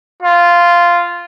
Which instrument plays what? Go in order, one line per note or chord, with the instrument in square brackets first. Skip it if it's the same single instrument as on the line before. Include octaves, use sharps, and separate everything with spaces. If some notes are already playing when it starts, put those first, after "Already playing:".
[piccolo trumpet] F4